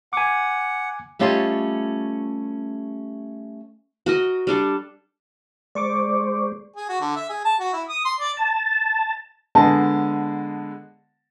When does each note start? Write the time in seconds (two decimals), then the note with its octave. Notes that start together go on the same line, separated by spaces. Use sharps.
0.13 F#5 G#5 D6
1.19 G3 A3 C#4 F4 G4 D#5
4.06 F#4 A#4 D#5
4.47 G3 D4 A4
5.75 G#3 C5 D5 C#6 D6
6.76 G#4
6.89 F#4
7.01 D3
7.16 E5
7.30 G#4
7.45 A5
7.60 F#4
7.73 E4
7.89 D#6
8.05 C6
8.20 D5
8.37 A5
9.55 D3 G#3 B3 D#5 G#5 A5